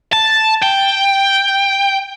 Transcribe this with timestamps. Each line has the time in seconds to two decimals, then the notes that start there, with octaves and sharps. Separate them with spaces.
0.13 A5
0.62 G5